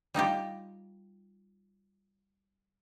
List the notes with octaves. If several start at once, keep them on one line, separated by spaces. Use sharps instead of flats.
G3 D#4 F4 G4